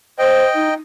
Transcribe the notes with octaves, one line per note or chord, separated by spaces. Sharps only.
C5 D#5 G5
D#4